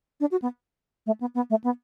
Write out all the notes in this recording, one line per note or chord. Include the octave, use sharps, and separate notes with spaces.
D4
F#4
B3
A3
B3
B3
A3
B3